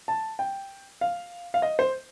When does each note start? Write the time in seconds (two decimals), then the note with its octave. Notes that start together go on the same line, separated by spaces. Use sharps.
0.08 A5
0.39 G5
1.01 F5
1.54 F5
1.62 D#5
1.79 C5